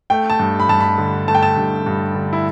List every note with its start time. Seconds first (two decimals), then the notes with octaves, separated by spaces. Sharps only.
0.10 A3 G5
0.30 A5
0.39 G2
0.60 B5
0.69 G2 A5
0.80 B5
0.98 D3
1.28 A3 A5
1.35 G5
1.42 A5
1.57 G2
1.86 G2
2.15 D3
2.33 E4